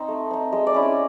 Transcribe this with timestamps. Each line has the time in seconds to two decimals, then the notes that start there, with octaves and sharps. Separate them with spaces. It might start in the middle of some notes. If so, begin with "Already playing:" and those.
Already playing: C4 D#4
0.08 A3
0.31 C4 D#4
0.53 G#3 D#5
0.67 D5
0.74 C#4 E4
0.82 D#5